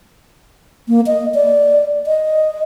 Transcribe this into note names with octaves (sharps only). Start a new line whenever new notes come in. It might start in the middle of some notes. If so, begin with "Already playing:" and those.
A#3
D#5
D5
D#5